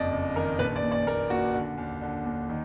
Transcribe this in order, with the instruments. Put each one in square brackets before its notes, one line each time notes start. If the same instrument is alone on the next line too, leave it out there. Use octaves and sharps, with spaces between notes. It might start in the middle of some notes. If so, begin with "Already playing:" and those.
Already playing: [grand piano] F#1 F2 D5 D#5
F#1
D#3 A#4
A#1 B4
D5
A#2
D5
A#2 A#4
A#2 F#4
D3
D#2
D3
D#2
D#3